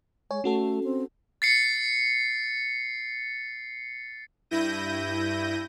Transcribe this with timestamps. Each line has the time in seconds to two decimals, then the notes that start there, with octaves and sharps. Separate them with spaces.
0.31 G#3 C#5 G#5
0.44 A3 C#4 F#4 A4
0.84 C4
1.42 A6 C7 C#7
4.51 G2 E4 G6 A#6 D#7